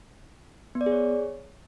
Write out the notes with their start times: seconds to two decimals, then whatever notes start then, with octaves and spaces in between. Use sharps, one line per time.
0.75 B3
0.81 D5
0.86 G#4
0.92 C#5